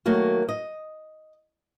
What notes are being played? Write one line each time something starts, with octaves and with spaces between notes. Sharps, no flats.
D#3 F#3 A3 A#3 F#4
D#5